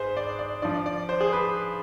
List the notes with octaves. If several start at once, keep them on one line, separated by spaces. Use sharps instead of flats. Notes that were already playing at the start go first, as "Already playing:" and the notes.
Already playing: G#2 G#4 B4 C5
D5
D5
G2 F3 D5
D5
C5
G#4
B4